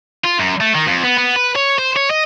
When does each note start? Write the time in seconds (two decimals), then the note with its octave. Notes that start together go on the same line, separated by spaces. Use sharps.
0.24 F4
0.39 F#2
0.60 A3
0.75 D#3
0.87 F2
1.04 B3
1.18 B3
1.36 B4
1.56 C#5
1.78 C5
1.97 C#5
2.11 D#5